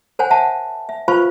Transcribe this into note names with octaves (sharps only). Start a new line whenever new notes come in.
A#4 C5 C#5 F#5 G#5
E5 F#5 A5
E5
F4 B4 C5 F5 B5 C#6